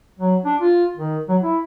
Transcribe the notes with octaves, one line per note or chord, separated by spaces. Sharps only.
F#3
D4
F4
D#3
F#3
E4